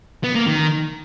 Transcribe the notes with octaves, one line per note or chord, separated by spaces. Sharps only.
B3
A#3
D#3